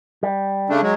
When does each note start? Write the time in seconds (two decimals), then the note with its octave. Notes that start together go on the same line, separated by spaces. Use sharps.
0.23 G3
0.69 C#3 A3 D4
0.81 F#3 G#3